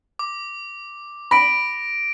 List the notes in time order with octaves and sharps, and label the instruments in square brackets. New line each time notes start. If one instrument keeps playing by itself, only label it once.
[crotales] D6
[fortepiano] B5 [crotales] A#6 D7